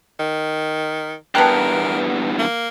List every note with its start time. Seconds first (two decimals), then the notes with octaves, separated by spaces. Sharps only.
0.19 D#3
1.35 E2 G2 B3 A#4 G5 A5 A#5 F#6
2.39 A#3